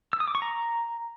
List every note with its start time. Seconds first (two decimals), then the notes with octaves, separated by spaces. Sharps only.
0.13 E6
0.20 D#6
0.28 D6
0.35 C#6
0.42 A#5